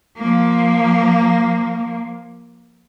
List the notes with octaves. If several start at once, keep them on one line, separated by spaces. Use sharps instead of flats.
F3 A#3